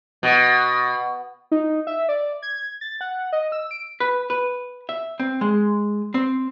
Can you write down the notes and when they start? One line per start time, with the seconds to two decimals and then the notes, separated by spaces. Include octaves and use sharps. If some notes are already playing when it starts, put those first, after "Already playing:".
0.23 B2
1.51 D#4
1.87 E5
2.09 D5
2.42 G#6
2.81 A6
3.01 F#5
3.33 D#5
3.52 E6
3.71 D7
4.00 B4
4.30 B4
4.89 E5
5.20 C4
5.41 G#3
6.14 C4